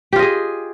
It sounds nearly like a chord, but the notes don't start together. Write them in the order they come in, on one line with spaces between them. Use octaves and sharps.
G4 F4 D#5 G#4